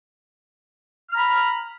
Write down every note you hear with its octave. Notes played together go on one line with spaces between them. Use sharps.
A#5 B5 F6